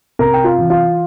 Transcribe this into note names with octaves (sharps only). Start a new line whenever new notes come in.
C3 A#4 A#5
G5
F4 F5
E3
F4 F5